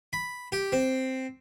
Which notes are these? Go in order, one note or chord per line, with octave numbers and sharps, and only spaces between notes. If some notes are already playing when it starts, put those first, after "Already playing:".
B5
G4
C4